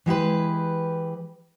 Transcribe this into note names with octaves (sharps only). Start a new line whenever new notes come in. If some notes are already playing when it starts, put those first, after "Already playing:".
E3 G#3 G4 B4